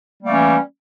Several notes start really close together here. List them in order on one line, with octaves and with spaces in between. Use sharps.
G3 A#3 A3 E3 C#4